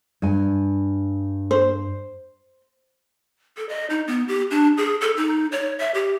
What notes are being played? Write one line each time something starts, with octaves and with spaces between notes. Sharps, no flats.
G2 G#5
C5
A4
D#5
D#4
B3
G4
D4
G#4
A4
D#4
C#5
E5
G4